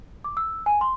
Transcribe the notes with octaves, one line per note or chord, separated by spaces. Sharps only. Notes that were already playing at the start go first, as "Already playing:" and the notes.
D6
E6
G#5
C6